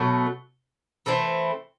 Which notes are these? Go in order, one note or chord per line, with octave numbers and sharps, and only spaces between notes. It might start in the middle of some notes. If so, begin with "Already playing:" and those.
Already playing: B2 F#3 A3
E3 A3 C4 E4